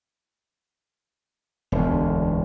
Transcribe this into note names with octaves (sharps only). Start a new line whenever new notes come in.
E1 D2